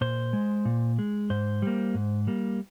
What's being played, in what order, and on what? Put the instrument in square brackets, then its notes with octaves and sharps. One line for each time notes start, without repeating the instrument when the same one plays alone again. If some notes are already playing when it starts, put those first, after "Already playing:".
[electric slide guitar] A#2 C5
G#3
A#2
G#3
G#2 C5
G3 A#3
G#2
G3 A#3